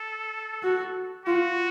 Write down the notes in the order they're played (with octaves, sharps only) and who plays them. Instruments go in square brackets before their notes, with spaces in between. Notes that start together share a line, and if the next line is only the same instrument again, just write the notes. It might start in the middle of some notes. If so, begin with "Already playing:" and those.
Already playing: [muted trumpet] A4
[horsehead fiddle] F#4
[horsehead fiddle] F4 [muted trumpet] F#4